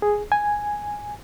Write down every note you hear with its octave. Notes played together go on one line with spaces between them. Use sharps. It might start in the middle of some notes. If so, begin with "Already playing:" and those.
G#4
G#5